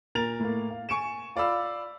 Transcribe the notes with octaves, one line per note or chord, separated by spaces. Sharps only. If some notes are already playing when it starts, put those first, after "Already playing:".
A#2 A#4 A6 F7
A2 A#3
F5
G#5 C#6 C#7 D7 E7
F4 D5 F5 B5 E6